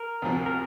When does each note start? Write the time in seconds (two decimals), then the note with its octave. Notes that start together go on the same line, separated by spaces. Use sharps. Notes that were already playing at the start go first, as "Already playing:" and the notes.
Already playing: A#4
0.22 D2 C3 F3
0.46 A#4